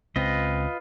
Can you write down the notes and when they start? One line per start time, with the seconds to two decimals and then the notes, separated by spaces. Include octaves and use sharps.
0.16 C#2 C4 F4 B4 D#5